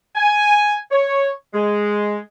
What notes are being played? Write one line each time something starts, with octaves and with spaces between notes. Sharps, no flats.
G#5
C#5
G#3